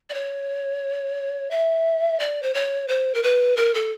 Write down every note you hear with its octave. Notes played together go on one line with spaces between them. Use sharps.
D5
C#5
E5
D5
C5
C#5
C5
A#4
B4
A#4
A4